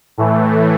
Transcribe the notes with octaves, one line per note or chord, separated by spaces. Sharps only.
A2 E3 A3